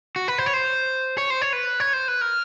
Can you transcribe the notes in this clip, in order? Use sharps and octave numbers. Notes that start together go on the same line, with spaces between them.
F#4
B4
C5
C#5
C5
C#5
C5
C#5
B4
C#5
C5
B4
A#4